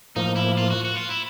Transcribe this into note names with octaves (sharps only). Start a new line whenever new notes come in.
A2 F3 A#3 D#4
E4
F4
F#4
F#4
F4
E4